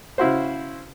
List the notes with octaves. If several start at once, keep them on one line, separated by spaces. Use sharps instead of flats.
C#3 E4 F#4 C5